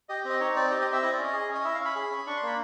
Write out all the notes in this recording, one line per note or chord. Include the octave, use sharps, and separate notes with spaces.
G4 D#5
C4
D#5
D#4 C#5
C4 D5
G4 D#5
D#5
C4
E5
E4 D#5
D5
C#4
D#5
G#4
C#4
D#5
E4 E5
F5
C#4
B5
G#4
C#4
D4 C#6
C6
A#3 B5